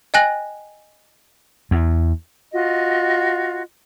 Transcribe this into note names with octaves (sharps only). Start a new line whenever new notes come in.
D#5 G5 G#5 F#6 A#6 F#7
E2
F4 F#4 D#5